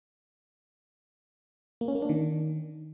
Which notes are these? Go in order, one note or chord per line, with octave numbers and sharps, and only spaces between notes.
A#3
C#4
A#3
D4
D#3